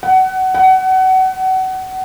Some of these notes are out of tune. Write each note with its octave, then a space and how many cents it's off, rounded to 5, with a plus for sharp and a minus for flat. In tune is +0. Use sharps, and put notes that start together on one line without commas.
F#5 +25
F#5 +30